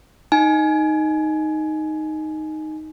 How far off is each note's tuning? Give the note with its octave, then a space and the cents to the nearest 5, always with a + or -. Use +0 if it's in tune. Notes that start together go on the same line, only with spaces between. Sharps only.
D#4 +0 G#5 +20